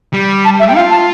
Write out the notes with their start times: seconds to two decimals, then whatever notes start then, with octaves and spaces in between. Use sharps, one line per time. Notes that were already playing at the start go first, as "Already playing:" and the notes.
0.13 G3
0.45 A5
0.60 E5
0.68 G5
0.76 F4 F5
0.91 A5